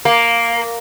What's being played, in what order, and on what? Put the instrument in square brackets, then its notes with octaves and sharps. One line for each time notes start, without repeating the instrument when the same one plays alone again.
[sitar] A#3